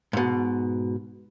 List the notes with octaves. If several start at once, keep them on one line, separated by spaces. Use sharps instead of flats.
G#2 B2